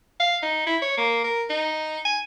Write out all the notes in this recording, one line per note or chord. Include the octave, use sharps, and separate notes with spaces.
F5
D#4
E4
C#5
A#3
A#4
D#4
G#5